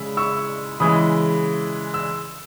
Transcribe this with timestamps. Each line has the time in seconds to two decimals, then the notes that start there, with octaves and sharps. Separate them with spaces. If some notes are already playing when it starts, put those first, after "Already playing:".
Already playing: C#3 G#3 B5 E6
0.17 C#6 E6
0.80 C#3 E3 G#3 B5 D#6
1.94 E6